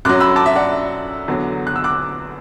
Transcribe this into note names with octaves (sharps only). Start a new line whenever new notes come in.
F#2 F#3 D6 F#6
B5 E6
A5 D6
E5
D5 F#5
E2 D3 F#3
F#6
E6
D6 F#6